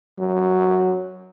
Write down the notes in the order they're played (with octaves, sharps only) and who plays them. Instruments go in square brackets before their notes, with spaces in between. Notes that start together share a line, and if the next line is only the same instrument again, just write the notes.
[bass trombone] F#3